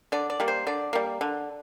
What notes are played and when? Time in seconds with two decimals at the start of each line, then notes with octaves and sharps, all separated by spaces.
0.12 D3 D5
0.30 D5
0.40 G3 A#3
0.48 C5
0.67 D3 D5
0.93 G3 A#3
1.21 D3